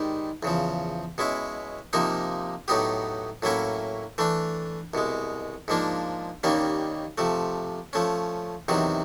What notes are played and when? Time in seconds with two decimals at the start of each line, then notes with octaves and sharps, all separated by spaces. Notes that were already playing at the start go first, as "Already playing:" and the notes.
Already playing: G#2 D#3 G3
0.43 E2 C#3 F3
1.18 B2 G#3 C#4 E4
1.93 C3 F3 A#3 D#4
2.68 A2 F#3 B3 D#4 G4
3.42 A2 F#3 A#3 C#4 E4
4.18 E3 A3 D4
4.94 C2 B2 G#3
5.68 G#2 F3 A#3 D4
6.43 D#2 D#3 G3 A#3 C#4
7.18 C3 F3 A3
7.93 F3 A3 C#4
8.68 E2 C3 D#3 F#3